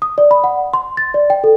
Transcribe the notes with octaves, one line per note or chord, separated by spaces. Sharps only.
D#6
D5
B5
F#5
C6
A6
D5
G5
A4